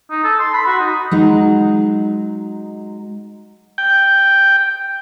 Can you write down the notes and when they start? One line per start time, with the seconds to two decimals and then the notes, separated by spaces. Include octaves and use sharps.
0.11 D#4
0.24 A4
0.39 C6
0.54 B5
0.66 F#4
0.79 D#4
1.11 F#3 G#3 D#4
3.78 G5